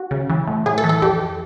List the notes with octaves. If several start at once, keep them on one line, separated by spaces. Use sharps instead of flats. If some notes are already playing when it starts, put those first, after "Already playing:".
Already playing: F#4
C#3
E3
A2
A2 G#4
A4
E3
A4
F2 G4